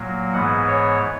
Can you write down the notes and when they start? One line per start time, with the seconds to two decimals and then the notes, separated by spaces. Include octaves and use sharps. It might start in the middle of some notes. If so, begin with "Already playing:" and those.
Already playing: A#2 F#3 A#3
0.33 G#2 E3 G#3 B3 F#5
0.67 C#5